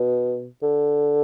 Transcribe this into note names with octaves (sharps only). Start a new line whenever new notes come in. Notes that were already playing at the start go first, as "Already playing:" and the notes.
Already playing: B2
D3